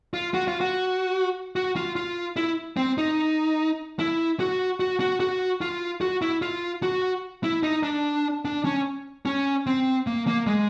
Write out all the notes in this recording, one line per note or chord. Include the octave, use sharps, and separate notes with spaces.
F4
F#4
F4
F#4
F#4
F4
F4
E4
C4
D#4
E4
F#4
F#4
F#4
F#4
F4
F#4
E4
F4
F#4
E4
D#4
D4
D4
C#4
C#4
C4
A#3
A#3
G#3